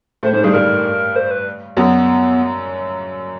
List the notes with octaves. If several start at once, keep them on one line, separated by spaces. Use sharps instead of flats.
A2 A3 C5
G#2 G#3 C5
G2 G3 G#4
G2 G3 A#4
C5
B4
F#2 F#3 B3